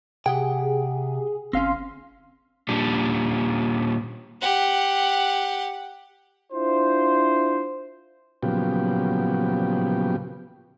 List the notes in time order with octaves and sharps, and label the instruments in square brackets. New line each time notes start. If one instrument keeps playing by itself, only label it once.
[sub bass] C3 [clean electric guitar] G4 F#5 G5 [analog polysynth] G#4
[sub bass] G1 [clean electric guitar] C4 C#4 [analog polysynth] F5 C6
[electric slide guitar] A#2 G3 D4
[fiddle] G4 F#5
[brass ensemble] D4 E4 F4 C5
[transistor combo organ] A#2 C#3 F3 F#3 B3 G4